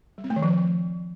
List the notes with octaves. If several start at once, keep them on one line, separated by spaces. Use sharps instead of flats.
G3
C4
A3
D#3
F3